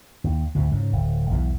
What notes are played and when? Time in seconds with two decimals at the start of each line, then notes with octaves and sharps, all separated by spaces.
0.24 D#2
0.55 D2 A2 C3
0.72 G#2 C#3
0.93 D1
1.29 B1 E2 D#3 E3